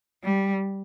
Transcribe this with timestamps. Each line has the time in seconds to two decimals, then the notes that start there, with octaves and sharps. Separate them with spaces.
0.24 G3